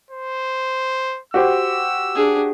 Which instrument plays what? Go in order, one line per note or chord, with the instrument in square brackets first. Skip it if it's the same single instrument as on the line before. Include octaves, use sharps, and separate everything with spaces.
[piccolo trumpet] C5
[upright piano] F#4 G4 C5 [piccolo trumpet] E6
[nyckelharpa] D4 G#4